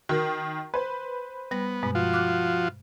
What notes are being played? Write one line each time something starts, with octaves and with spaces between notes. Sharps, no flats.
D#3 F#4 A#4
B4 C5
G3 B3 A#6
G2 B2 G#3
F3 F4 F#4
D6 F6 F#6